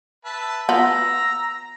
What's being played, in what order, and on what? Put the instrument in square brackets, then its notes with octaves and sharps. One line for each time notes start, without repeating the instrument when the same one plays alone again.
[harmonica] B4 E5 A5
[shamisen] B3 F4 [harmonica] A#5 E6